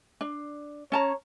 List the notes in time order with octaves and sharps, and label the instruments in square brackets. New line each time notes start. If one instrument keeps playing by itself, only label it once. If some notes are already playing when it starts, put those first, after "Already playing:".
[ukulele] D4
[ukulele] C#4 A5 A#5 [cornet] C#5